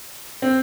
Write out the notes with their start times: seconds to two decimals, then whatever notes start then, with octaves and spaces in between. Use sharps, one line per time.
0.42 C4